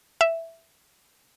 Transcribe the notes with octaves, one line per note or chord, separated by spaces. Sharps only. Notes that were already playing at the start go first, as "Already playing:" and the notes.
E5